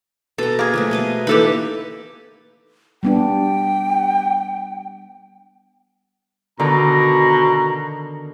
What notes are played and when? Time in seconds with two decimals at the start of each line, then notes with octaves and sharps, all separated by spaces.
0.38 B2 A4 A#5
0.59 A#3 G#4
0.74 F3 F#3 A3
0.91 B2 D#5 F5
1.27 E3 A#3 D#4 G4 A4 B4
3.03 G3 B3 D4 G5
6.59 B2 D3 D#3 A#5